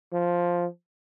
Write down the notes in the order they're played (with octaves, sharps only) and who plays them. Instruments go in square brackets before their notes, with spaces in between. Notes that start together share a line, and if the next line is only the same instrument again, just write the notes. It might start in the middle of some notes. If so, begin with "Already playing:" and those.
[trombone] F3